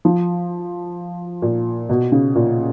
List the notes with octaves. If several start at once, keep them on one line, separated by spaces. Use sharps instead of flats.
F3
A#2
B2
C#3
A#2